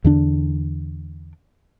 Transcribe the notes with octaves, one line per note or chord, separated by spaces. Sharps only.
E2 D3 D4